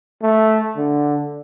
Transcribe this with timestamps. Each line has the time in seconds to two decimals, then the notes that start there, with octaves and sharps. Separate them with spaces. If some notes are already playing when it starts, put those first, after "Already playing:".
0.22 A3
0.76 D3